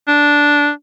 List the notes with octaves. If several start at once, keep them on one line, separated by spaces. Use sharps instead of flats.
D4